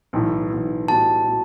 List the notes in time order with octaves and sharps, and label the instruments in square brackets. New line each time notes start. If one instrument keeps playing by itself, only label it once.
[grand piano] B1 A2 E3
B1 A2 E3
[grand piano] A2 G3 B3 F#4 [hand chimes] A5
[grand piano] A2 G3 B3 F#4